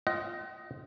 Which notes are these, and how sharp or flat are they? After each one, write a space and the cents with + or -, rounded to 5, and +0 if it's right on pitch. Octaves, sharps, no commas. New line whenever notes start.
F4 -5 D#5 +10 F#5 +45